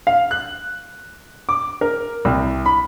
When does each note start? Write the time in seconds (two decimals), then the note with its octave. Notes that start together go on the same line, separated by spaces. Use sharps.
0.07 F5
0.31 F#6
1.49 D6
1.81 A#4
2.25 C2
2.66 B5